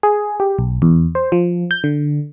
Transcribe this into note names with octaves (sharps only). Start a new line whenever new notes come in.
G#4
G4
B1
E2
C5
F3
G6
D3